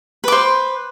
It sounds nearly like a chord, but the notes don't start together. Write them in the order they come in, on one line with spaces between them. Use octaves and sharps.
B4 D6 C5